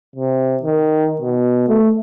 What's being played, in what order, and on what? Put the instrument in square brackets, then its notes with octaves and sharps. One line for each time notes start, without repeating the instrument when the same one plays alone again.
[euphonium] C3
D#3
B2
A3